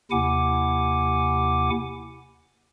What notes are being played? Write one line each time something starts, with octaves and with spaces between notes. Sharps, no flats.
D#2 C3 E4 F#5 G#5 D6